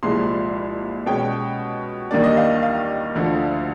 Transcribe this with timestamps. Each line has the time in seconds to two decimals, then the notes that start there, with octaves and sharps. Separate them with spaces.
0.03 C2 A#2 F3 G#3 C6
1.06 B2 G#3 C#4 G5
2.11 D#2 D#3 G3 A#3 D4 D5
2.23 D#5
2.37 F5
2.63 F5
3.15 D2 D3 F3 A3